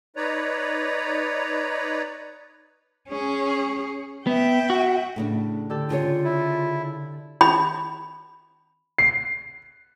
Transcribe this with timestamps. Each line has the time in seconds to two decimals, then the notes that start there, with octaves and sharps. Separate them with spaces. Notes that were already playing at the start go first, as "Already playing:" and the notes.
0.16 D#4 B4 C#5 D5 A#5
3.08 C#4 G#4
4.27 B3 E5 G5
4.70 F#4
5.16 A2 C#3 D4
5.70 D3 G4 A4
5.90 C#3 F4 G#4 C#5
6.25 E4
7.41 B5
8.98 C7